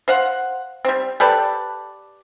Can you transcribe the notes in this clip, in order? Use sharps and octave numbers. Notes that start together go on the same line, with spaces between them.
C5 F5 F#5
G3 C4
G4 A4 B4 D5